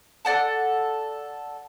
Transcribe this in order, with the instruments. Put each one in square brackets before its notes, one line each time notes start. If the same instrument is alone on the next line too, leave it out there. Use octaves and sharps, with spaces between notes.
[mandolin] A4 D5 F#5 A5